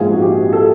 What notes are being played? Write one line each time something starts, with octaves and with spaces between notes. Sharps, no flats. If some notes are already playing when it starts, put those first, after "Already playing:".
Already playing: A#1 G#2 F3 G#3 G#4
F#4
G4
A4